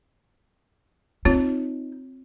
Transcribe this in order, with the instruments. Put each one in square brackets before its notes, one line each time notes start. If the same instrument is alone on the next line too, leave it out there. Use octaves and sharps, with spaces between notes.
[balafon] C4 F4 C#5 [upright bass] D#4